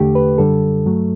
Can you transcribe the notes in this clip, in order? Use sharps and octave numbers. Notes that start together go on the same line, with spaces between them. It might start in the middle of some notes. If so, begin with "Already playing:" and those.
Already playing: E2 D3 A3 G4
B4
F#2 D3 G3 A4
G2 F#3 A3